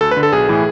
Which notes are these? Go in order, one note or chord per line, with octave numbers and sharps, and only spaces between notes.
D2 A4
B4
D3
A4
B1 G#4
A2 E3